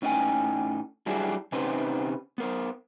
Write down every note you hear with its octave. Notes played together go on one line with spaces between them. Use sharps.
A2 C#4 D#4 D#5 G5 G#5
F#3 G3 D4 E4 G4 G#4
C3 C#4 D#4 G4 B4 C5
B3 A#4 C5